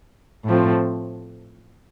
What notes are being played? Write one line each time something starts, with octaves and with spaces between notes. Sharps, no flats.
A2 F3 A3 C4